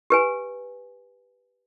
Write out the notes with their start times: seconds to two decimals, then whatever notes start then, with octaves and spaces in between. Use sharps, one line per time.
0.10 G4 B4 G#5